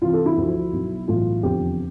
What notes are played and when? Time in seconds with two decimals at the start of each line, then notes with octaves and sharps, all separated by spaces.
0.02 C2 C3 E3 F4
0.13 A4
0.26 E4
0.37 D2 D3 F3
0.72 B1 B2
1.08 B1 A2 E3 F4
1.43 F1 E2 D3 F3 G4